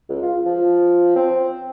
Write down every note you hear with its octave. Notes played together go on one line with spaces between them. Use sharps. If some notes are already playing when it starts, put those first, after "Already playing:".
C#2
F4
F3
C4